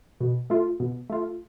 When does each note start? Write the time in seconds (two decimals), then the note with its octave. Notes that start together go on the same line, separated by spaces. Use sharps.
0.20 B2
0.50 A3 F4
0.80 B2
1.10 A3 F4